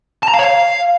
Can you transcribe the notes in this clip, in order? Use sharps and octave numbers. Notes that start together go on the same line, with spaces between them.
A5
A#5
F5
C#5
F5